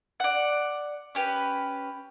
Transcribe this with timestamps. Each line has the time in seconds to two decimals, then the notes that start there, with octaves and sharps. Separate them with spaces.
0.20 D5 F#5
1.15 C#4 G4 B4